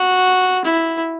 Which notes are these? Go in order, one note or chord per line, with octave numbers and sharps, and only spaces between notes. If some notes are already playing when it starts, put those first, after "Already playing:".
Already playing: F#4
E4